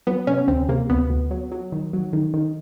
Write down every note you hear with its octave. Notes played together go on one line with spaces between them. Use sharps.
F#3 B3
C3 C#4
D2 C4
C3 A#3
D2 B3
D2
F#3
F#3
D#3
F#3
D#3
D#3